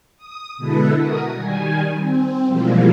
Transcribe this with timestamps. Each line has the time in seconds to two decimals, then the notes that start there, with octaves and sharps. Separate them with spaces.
0.18 D#6
0.57 B2 D3 G#3 E4 A4 B4
0.98 F#4 A#4 D#6
1.33 D#3 G3 G#5
1.96 C4
2.47 B2 E3 F3 G3 G#3 A#3